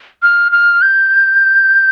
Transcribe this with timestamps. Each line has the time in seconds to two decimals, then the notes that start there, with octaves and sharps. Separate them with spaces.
0.23 F6
0.52 F6
0.82 G6